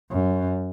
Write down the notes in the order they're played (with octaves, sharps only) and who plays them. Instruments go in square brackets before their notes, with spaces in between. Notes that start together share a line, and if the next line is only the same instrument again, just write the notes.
[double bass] F#2